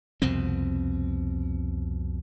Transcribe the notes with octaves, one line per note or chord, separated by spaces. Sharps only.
C2 F2 B2 C4